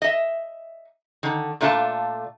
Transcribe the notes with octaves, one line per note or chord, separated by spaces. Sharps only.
D#5 E5
D3 D#3
A#2 A3 D4 F4 B4 A5